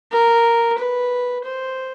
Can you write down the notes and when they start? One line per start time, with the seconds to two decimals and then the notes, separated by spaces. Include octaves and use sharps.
0.12 A#4
0.78 B4
1.44 C5